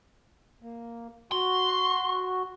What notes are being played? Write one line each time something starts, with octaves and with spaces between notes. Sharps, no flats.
A#3
F#4 C6